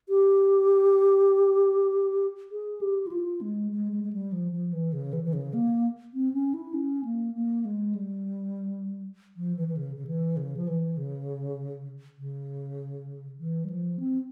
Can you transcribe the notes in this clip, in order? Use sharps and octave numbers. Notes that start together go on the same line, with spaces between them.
G4
G#4
G4
E4
F4
G#3
G#3
G#3
G#3
G3
F3
F3
E3
C#3
E3
E3
C#3
A#3
C4
C#4
E4
C#4
A#3
A#3
G#3
G3
F3
E3
E3
C#3
C#3
E3
C#3
F3
E3
C#3
C#3
E3
G3
F3
C4